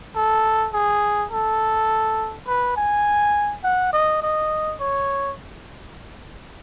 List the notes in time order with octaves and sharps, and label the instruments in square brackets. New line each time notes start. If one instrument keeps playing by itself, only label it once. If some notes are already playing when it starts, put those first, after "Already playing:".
[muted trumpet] A4
G#4
A4
B4
G#5
F#5
D#5
D#5
C#5